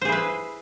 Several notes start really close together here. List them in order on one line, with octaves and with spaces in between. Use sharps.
C5 G#4 E4 B4